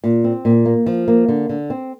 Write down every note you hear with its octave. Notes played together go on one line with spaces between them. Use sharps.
A#2
C4
A#2
A#3
F3
A#3
D3
D3
C4